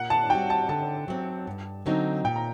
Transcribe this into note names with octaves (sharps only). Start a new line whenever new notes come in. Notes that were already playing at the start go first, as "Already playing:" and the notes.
Already playing: A#2 F#5
A5
G3 C4 F#4 G5
A5
D3 A5
F#3 C4
G2
D3 F#3 C4 D#4
A#2 G5
A#5